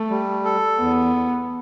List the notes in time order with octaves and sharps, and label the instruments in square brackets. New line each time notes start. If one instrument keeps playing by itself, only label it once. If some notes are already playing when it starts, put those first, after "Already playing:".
Already playing: [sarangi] A3
[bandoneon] G3
A4
[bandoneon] E2 [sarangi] B3